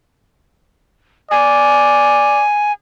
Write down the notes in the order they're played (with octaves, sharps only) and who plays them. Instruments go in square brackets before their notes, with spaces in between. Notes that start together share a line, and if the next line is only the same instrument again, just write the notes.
[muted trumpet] D5 [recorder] G#5